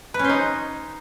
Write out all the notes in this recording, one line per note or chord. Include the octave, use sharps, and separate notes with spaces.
B4
C#4
C5
D#4